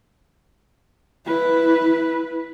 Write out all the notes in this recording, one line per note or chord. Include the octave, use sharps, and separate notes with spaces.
E4 B4